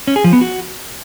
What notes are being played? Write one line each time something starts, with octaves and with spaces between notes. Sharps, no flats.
C#4
G#4
F3
B3
F#4